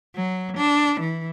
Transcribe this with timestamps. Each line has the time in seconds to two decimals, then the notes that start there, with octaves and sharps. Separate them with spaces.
0.16 F#3
0.57 D4
1.00 E3